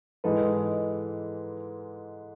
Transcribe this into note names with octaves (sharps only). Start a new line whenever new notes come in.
G#2 E3 G#3 A4 B4